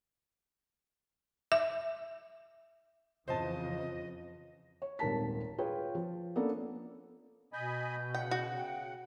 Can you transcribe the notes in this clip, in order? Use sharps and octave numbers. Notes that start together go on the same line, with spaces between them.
E5
F2 C#3 E3 F3 F4 C5 D#5 A5
C#5
D#1 G#1 A#4 A5 B6
F4 G#4 B4 C#5 G5
F3
A#3 B3 C#4 D4 A4
B2 D#5 G#5 B5 G6
C#3 F#5 G5
F#4
G5